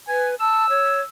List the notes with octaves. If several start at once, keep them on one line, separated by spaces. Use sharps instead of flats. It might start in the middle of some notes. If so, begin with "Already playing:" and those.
B4 G#5
A5 E6
C#5